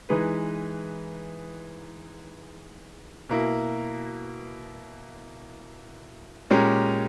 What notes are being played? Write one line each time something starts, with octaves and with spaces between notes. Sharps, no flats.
E3 G#3 D#4 G#4 B4
B2 A#3 E4
A#2 G#3 C#4 G4 A#4